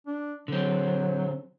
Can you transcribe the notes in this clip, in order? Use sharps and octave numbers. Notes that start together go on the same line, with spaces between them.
D4
D3 F#3 C4